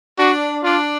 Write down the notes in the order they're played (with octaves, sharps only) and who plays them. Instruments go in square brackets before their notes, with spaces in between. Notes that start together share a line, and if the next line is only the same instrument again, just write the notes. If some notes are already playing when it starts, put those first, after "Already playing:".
[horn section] D4 [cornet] F#4
[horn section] D4 [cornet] F4